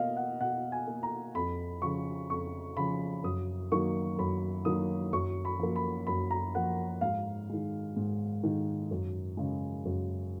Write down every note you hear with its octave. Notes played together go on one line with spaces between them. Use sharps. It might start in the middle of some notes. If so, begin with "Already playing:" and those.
Already playing: B2 A#3 D#5 F5
F#5
B2 F#5
G#5
A#3
A#5
F2 B5
C#3 F3 C#6
F2 C#6
C#3 F3 B5
F#2 D#6
D#3 F#3 A#3 C#6
F#2 B5
D#3 F#3 A#3 D#6
F#2 C#6
B5
F3 A#3
B5
F#2 B5
A#5
F3 A#3 F#5
G#2 F5
D#3 G#3
G#2
D#3 G#3
F#2
C#3 G#3
F#2